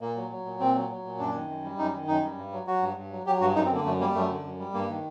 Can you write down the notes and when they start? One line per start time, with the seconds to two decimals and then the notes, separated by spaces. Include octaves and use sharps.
0.01 A#2 A#3
0.16 F#3
0.30 F#3
0.46 A#2
0.60 A#2 C4
0.75 F#3
0.90 F#3
1.05 A#2
1.19 F#2 D4
1.34 D#3
1.49 F#2
1.64 G3
1.78 F#2 D#4
1.93 D#3
2.07 F#2 D#4
2.22 G3
2.37 G2
2.52 F#3
2.67 F#3 F#4
2.82 G2
2.97 G2
3.11 F#3
3.26 F#3 G4
3.41 G2 F#4
3.55 F#2 D#4
3.65 C4
3.71 D3 A#3
3.85 F#2 A3
4.00 G3 A#3
4.15 F#2 A3
4.29 D3
4.44 F#2
4.59 G3
4.74 G2 A#3
4.89 D#3